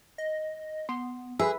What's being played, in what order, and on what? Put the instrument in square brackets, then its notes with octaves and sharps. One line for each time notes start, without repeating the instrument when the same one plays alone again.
[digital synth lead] D#5
[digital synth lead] B3 [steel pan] C6
[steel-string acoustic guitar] G#4 [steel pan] B4 E5 [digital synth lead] E6